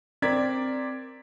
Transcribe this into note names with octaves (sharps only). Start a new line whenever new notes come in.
C4 A#4 D5 G#6 B6